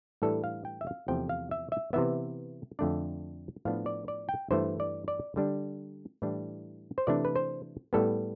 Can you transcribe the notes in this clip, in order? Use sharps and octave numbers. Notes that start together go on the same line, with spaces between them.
A2 E3 G3 D4 A4
F5
G5
E5
F5
E2 C3 F3 A3 C4 G5
F5
E5
E5
C3 E3 B3 E5
F2 D3 A3 D4 D5
A2 F3 B3 D4 F5
D5
D5
G5
G2 E3 A3 C5
D5
D5
D3 G3 D4
A2 E3 G3 D4
C5
C3 E3 A3 D4 D5
B4
C5
A2 G3 B3 A4